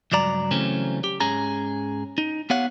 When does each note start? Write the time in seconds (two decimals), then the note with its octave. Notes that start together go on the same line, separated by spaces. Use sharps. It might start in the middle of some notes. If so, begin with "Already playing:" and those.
0.12 C#2 G2 F#3 D5 A#5
0.51 C#3 E3 F#3 A3 C4 C#4
1.04 G4
1.20 G#2 C#4 G#4 A#5
2.18 D#4
2.50 B3 G4 C#5 F5 F#5